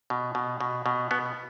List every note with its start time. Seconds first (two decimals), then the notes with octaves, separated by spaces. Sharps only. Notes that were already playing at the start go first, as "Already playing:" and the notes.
0.10 B2
0.35 B2
0.61 B2
0.86 B2
1.11 B2 B3